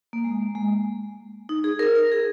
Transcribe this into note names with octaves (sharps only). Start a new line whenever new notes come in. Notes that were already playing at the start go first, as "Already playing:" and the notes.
A#3
G#3
A#3
G#3
D#4
G#4
A#4
A#4
G#4